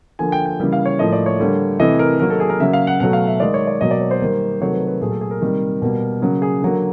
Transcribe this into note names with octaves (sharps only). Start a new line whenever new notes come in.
D3 F3 A#3 G#5
G5
G5
C#3 E3 G3 A#3
F5
C#5
A2 F3 A#3 D#5
D5
C#5
D3 G3 A#3
C3 E3 A3 D#5
A#4
D#3 F#3 A#3 A#4
A4
G#4
A#4
C#3 F#3 A#3 E5
F5
F#5
B2 F#3 A3 F#5
F5
E5
D#3 G#3 D5
C#5
D5
B2 F#3 A#3 D#5
D5
C#5
C5
D#3 G3 A#3
C3 D#3 F#3 A3 C#5
B4
B4
A#2 F#3 A3 G#4
A4
G#4
A#4
C3 D#3 G3 A#3
B2 G3 A#3
C#3 F#3 A#3
G#4
D3 F#3 A#3